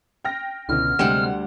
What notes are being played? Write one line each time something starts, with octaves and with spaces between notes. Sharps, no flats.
G5 F6 A#6
C#2 B2 D3 C#4 E4 F6
D2 C3 G3 G#3 F#5 E7